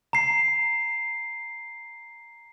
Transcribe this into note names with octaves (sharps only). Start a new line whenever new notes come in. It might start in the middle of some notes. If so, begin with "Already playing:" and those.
A#5 C7